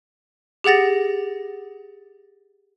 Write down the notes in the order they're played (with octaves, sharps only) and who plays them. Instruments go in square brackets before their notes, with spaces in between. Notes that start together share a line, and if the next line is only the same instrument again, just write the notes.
[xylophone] G4 G#4 F#5 A6 A#6